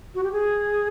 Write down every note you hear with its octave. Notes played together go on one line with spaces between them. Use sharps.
F#4
G4
G#4